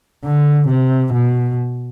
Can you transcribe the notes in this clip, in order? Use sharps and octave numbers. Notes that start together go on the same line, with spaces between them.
D3
C3
B2